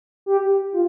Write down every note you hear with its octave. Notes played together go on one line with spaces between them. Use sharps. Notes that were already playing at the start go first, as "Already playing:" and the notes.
G4
F4